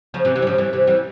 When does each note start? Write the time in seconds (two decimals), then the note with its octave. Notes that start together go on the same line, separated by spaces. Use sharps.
0.14 C#3 F3
0.25 C3 E3
0.36 C3 E3
0.42 G3
0.47 C#3 F3
0.58 E3 G3
0.73 C3 E3
0.87 E3 G3